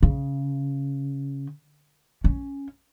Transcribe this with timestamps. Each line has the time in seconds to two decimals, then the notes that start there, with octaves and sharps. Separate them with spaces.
0.02 C#3
2.24 C#4